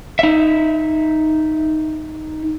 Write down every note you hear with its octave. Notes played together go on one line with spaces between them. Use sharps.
D#4 E5